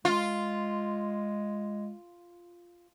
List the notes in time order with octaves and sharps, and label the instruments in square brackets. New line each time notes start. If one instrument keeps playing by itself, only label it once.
[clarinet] G#3 [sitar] F4